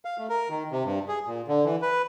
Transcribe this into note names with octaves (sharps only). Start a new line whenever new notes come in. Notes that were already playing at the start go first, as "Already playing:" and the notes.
F5
A3
A#4
D#3
C3
G2
G#4
A#2
D3
E3
B4